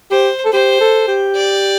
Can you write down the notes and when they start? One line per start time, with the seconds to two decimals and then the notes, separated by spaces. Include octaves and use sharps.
0.11 G4 C5
0.45 A4
0.52 G4 C5
0.80 A4
1.08 G4
1.35 D5